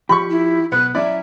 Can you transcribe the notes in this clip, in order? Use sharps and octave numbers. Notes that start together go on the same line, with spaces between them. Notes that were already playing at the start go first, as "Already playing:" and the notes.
F3 G4 B5 C#6
E4
B1 B3 F#6
F#3 C#4 E4 D5 E5